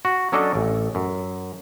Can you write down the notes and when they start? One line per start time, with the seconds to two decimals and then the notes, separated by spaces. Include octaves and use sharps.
0.05 F#4
0.32 F#3 C#4 D4 A4 D5 D#5
0.55 A1
0.95 F#2